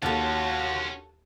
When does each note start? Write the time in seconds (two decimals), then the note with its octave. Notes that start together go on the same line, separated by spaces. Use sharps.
0.02 D#2 C#4 F4 F#4 A4 A5